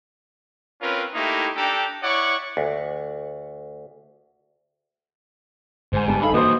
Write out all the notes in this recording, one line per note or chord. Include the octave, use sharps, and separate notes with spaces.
C4 C#4 F4 A#4 B4
A3 A#3 D#4 E4 G4
D4 G4 A4 G5 A#5
E4 C#5 D5 F#5 C#6
D2
G1 G#2 C5 G#5
G3 B3 A5
D#4 A4 F5 B5
E3 A#3 F#4 B4 C5 D#6